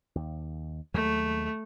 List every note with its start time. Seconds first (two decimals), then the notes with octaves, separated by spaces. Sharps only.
0.15 D#2
0.94 D#2 F#3 G#3 A3